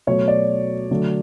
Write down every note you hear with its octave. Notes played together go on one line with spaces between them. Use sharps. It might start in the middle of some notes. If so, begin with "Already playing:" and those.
B2 F#3 A3 C#5
D5
D3 F#3 A3